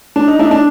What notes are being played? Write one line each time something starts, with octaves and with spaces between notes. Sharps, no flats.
D4
D#4
D4 E4
D#4
D4